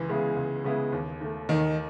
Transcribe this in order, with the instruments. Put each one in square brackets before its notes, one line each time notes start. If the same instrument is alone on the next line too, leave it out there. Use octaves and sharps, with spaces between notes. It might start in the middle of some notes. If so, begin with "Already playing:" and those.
Already playing: [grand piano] C#2 [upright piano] E3
[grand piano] C#3 G#3 B3 E4
C#2
C#3 G#3 B3 E4
D#2
D#3 A3
[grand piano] D#2 [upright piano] D#3